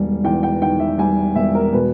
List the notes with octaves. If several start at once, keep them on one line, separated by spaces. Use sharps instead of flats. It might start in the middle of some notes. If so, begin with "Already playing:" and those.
Already playing: E1 D#3 G3
E2 G5
G5
D#3 G5
E5
G3 G#5
E1 E5
A#4
B2 B4